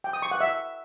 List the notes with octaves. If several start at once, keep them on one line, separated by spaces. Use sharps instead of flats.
G5
D#6
C#6
F#5
E5